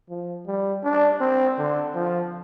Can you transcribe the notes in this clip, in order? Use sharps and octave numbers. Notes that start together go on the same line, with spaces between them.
F3
G3
D4
C4
D3
F3